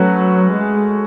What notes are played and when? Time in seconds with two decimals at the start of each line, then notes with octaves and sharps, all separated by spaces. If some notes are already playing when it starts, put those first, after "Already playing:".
Already playing: F#3 A3 C#4 F#4 B4
0.50 G#3